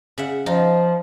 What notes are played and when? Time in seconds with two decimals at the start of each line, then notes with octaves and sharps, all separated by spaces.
0.18 C#3 E5 F#5
0.46 F3 D#4 F4